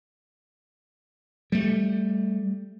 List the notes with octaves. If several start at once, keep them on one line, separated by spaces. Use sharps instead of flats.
G3 A3